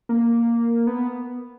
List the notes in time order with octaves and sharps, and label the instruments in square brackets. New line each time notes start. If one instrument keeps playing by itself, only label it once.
[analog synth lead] A#3
B3